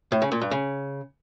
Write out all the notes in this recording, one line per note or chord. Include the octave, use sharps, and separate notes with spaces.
A2
C#3
A#2
G2
C#3